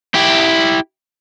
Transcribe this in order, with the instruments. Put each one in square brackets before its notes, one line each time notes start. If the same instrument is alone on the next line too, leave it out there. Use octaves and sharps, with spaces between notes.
[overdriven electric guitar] E4 G4